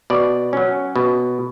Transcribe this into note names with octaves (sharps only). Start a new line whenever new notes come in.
B2 D5
F#3 C#4
B2